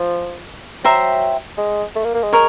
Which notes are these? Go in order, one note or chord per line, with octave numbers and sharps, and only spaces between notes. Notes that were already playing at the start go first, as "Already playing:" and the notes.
Already playing: F3
F#3 C5 E5 G5 A#5
G#3
A3
A#3
A#3
G#3
A#4 C#5